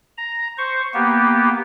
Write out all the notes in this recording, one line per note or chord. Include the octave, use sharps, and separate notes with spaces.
A#5
C5 C#6
A#3 B3 G4